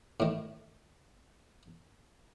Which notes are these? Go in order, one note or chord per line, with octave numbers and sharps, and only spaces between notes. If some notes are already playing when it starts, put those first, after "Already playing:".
A2 D#3